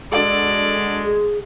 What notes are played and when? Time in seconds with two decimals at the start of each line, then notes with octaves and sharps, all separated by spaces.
0.12 G#3 D4 F#4 A4 D5
1.05 G#4